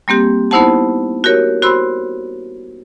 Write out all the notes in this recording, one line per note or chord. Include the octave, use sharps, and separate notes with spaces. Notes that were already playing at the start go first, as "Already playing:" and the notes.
G3 A#3 C4 G4
B3 D#4 E4 C5 F#5 A5
F#4 G4 A#4 C#5
F#4 C5 B5 C6 E6